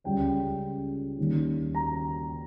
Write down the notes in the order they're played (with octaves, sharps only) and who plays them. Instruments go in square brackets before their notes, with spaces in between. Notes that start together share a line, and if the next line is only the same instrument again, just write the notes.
[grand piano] C#2 C#3 G3 C#4 G5
D#2 D#3 G3 A#3 C#4
A#5